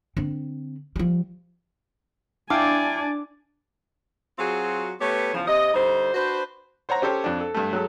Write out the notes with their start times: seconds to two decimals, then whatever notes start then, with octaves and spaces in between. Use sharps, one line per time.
0.17 D3 C4
0.96 F3 G3
2.50 D4 E4 D5 F5 G5 G#5 D6
4.39 F#3 C4 F4 F#4 G#4
5.01 A3 B3 G4 B4 C#5
5.34 E2 C#3 F3
5.47 C3 D#5
5.74 D3 G3 D#4 C5
6.14 D4 F#4 B4 C5
6.89 C5 C#5 F#5 A#5
7.02 C#4 G4 A4 C5 C#5
7.24 F2 D4
7.40 A4
7.55 G2 A3
7.73 F#3 G#3 A4